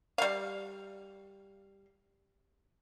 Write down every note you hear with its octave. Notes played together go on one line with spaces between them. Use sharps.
G3 F5